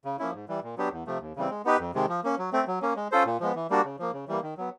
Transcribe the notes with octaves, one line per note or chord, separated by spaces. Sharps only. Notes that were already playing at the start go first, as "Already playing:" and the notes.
C#3
F3 A#3 C#4 E4
G#2
E3 G3
A#2
F#3 B3 D4 G4
E2
C3 F3 A3
D#2
C#3 E3 G3 C4
G#3
B3 D#4 G4 B4
F2
C3 D#3 G#3
F3
A#3 C#4
F#3
A3 C4
F#3
A#3 C#4
G#3
C#4 F4 A4 C5
A#2
F3 G#3 B3
E3
G3 A#3 D4 F#4
C#3
F3 A#3
C#3
E3 G3 A#3
D#3
F#3 B3